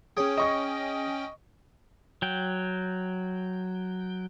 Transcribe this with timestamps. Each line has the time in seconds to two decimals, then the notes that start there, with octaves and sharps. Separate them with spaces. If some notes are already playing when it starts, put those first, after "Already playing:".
0.17 C#4 G#4 C#5 G5
0.37 D#5 C#6 A#6
2.22 F#3 G5